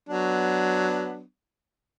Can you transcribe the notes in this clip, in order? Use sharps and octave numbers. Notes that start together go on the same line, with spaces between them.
F#3 B3 D4